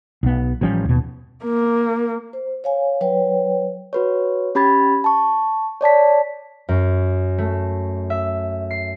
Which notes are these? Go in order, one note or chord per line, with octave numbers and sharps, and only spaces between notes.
B1 B3
A1 F3 G3 C#4
D#2 B2
A#3
C5
C#5 F5 G#5
F#3 B4 C#5 G5
F#4 B4 C#5
C#4 G4 B5 G#6 A6
A5 C#6
C#5 D5 A5 B6
F#2
A3
E5
C7